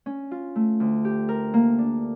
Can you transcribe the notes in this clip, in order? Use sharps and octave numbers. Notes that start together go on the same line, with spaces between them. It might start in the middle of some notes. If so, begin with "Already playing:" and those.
C#4
F4
A3
D2
G4
A#4
A#3
D4